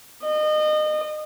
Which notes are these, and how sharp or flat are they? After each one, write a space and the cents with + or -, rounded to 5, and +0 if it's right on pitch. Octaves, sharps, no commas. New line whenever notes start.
D#5 -30